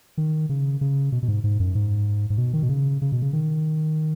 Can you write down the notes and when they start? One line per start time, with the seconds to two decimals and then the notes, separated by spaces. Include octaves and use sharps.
0.18 D#3
0.49 C#3
0.81 C#3
1.12 B2
1.23 B2
1.28 G#2
1.44 G#2
1.60 F#2
1.75 G#2
2.30 G#2
2.38 B2
2.53 D#3
2.63 B2
2.69 C#3
3.02 C#3
3.12 B2
3.22 C#3
3.33 D#3